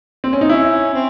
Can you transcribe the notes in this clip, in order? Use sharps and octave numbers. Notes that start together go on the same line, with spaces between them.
C4
C#4
D#4
C#4 E4
C4